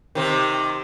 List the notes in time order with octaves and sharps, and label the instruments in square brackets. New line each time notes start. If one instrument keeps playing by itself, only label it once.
[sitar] C3 D#3